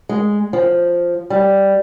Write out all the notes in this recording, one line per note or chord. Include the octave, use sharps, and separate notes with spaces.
G#3
F3
G3